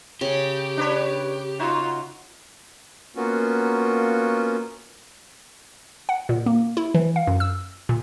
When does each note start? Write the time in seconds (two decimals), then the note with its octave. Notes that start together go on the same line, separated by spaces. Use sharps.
0.21 C#3 C#4 G4
0.77 D4 B4 C#5
1.59 D#4 F4 F#4
3.16 A#3 B3 C#4 F4 F#4
6.09 F#5
6.29 A#2
6.46 A#3
6.77 E4
6.94 E3
7.16 F5
7.27 F#2
7.40 E6
7.89 A#2